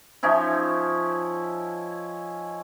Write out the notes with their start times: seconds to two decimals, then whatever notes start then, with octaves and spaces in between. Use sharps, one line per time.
0.23 F3 C#4 D#4 E4